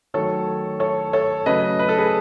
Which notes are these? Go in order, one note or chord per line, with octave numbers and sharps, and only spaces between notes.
D#3 F#3 A3 A4 C#5
A4 C#5
A4 C#5
C#3 F#3 A3 B4 D#5
B4
A4
G#4 B4